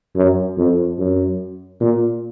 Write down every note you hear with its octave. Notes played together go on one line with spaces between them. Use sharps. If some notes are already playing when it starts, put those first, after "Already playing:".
F#2
F2
F#2
A#2